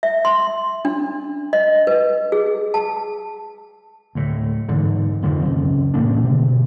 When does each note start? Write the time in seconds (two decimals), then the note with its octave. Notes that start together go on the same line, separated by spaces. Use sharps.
0.03 E5
0.25 C6
0.85 D4
1.53 D#5
1.87 B4
2.32 G#4
2.74 A5
4.15 D2 A2
4.68 G#2 D3 E3
5.22 F2 D3 D#3 F3
5.42 C#2 F#2
5.94 A1 A2 A#3 D4
6.23 B2 D3